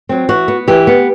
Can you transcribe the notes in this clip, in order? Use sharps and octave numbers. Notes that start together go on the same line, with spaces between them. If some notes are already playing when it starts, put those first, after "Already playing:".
F#3 C4
E3 F#4
B3
E3 G4
B3